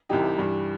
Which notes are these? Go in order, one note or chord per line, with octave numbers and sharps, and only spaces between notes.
C2 C3 E3 G3 D#4 G4
G4
G2 E3 G3